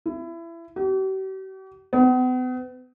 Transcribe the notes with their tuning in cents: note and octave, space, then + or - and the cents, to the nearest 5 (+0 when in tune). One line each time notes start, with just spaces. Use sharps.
E4 +25
G4 -45
B3 +40